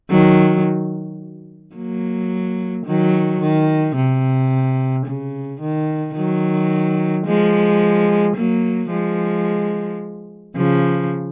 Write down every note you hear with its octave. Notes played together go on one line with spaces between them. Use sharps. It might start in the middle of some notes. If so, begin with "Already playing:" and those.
D#3 F#3
F#3 A#3
D#3 F#3
D#3
C3
C#3
D#3
D#3 F#3
F3 G#3
F#3 A#3
F3 G#3
C#3 F3